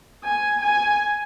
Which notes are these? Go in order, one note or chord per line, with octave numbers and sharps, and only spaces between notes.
G#5
G#5